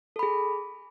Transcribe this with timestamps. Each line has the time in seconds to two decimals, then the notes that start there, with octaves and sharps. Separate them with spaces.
0.16 A4
0.19 B5
0.23 G#4